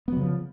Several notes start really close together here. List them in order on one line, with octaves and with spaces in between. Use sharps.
B3 F#3 C#3 F3